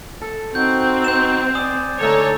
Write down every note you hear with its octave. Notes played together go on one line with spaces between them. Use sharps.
A4
C4 D#4 F#4 G6
G6 E7
D5 G#5 D#6
D3 A3 D#4 A4 C#5